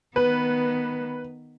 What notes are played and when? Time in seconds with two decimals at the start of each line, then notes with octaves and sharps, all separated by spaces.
0.16 D#3 B3 B4